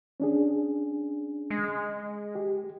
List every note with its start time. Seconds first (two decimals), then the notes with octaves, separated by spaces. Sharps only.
0.20 C#4 D4 G#4
1.50 G#3
2.35 G4